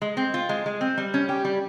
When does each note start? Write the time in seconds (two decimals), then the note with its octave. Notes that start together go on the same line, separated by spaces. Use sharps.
0.02 G#3
0.17 C4
0.34 F4
0.49 G#3
0.66 G#3
0.81 C4
0.98 G3
1.14 C#4
1.29 G4
1.45 G3